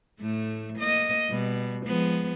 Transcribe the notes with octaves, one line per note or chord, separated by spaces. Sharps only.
A2 A3
A#3 D#5
B2 G3
F3 G#3 B3